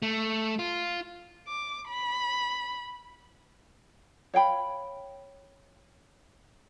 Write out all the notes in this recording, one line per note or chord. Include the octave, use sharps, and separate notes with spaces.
A3
F4
D6
B5
C#5 F5 G5 B5